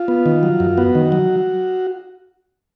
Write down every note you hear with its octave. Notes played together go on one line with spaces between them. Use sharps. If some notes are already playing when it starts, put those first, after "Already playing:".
Already playing: F4
B3
D#3
F#3
F#2
B3 F#4
D#3
F#3